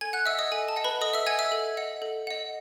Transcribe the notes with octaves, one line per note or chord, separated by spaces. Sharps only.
A4 G#5 G#6
F#5 F#6
D#5 E5 F#5 E6
D#5 D#6
A4 G#5
A5
D#5 F#5
B4 B5
A4 D#5 D#6
E5 E6
D#5 F#5 G#5 G#6
E5 E6
A4
D#5 F#5
A4
D#5 F#5